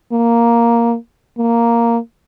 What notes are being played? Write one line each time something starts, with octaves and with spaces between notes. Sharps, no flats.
A#3
A#3